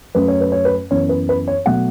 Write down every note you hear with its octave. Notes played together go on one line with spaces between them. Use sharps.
F#2 F#3 A3 C#4 B4
C#5
B4
C#5
B4
F#2 E3 B3 C#5
B4
B4
C#5
B2 F#3 A3 F#5